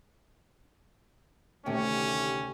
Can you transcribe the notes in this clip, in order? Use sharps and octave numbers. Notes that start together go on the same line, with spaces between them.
D2 C3 D#3 A3 C#4 G4 G5